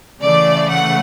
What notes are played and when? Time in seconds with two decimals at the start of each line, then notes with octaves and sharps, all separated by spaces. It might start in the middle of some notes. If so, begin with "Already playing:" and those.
0.21 C#3 E3 A3 D5
0.68 F#5